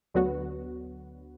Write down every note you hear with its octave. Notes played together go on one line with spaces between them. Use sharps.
D2 D3 F#3 B3 F#4